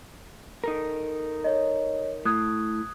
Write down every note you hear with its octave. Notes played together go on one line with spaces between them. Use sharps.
D#4 A4 A#4
C#5 D#5
A2 D#6 F#6 G#6